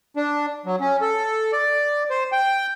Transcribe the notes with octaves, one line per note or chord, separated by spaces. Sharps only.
D4
F#3
C#4
A4
D5
C5
G5